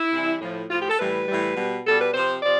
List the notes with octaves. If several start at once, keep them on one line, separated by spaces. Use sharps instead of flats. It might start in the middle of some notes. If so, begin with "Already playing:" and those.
Already playing: E4
C3 E3 G3
A2 F3
A2 F3 F4
G4
A4
A2 E3 G3 B4
A2 E3 G3
B2 G3
B2 G3 A4
B4
C3 F3 C5
C3 F3 D5